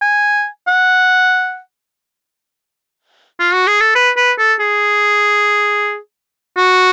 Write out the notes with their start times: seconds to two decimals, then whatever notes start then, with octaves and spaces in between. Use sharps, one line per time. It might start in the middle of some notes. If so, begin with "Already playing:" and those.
0.02 G#5
0.68 F#5
3.40 F4
3.54 F#4
3.67 G#4
3.80 A4
3.95 B4
4.17 B4
4.39 A4
4.60 G#4
6.57 F#4